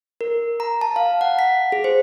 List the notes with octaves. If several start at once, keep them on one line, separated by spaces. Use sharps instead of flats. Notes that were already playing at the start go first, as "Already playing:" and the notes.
A#4
A#5
A5
F5
F#5
B6
G#4
C5